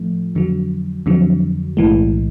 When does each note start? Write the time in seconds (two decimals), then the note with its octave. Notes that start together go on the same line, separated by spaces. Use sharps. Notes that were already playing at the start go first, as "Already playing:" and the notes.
Already playing: A2 F3 A3
0.35 F2 D3 F#3
1.06 F2 D3 F#3
1.77 B1 A2 E3 G#3